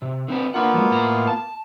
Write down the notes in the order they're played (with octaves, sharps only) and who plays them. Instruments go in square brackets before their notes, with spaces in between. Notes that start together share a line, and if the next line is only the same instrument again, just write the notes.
[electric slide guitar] C3
D3 C4 B4
[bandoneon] A#3 B3 F4 [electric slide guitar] D4 F#5
[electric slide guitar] F3 F#3 G#3
A2 A#5
A5